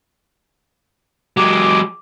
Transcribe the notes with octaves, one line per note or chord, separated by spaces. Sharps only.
F#3 G#3 D6